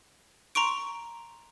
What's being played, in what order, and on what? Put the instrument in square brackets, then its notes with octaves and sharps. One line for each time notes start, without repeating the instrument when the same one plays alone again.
[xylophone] A#5 C6 C#6 D7